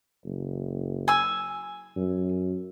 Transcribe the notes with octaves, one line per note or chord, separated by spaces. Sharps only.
F#1
G#5 E6
F#2